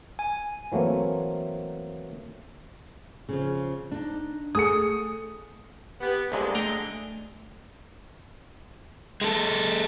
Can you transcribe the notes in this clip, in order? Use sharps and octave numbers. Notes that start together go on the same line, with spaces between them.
G#5
E3 F#3 A3 A#3 C4
C#3 F3
D4 D#4
A3 G#4 F#5 D#6 C#7
B3 G4
C2 A#2 D3 G#3
A3 G5 A#5
G#3 A4